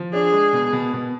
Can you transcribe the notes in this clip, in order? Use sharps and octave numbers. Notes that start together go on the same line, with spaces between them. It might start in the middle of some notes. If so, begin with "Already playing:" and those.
Already playing: F3
D4 G#4
G#3
B2
B2
B2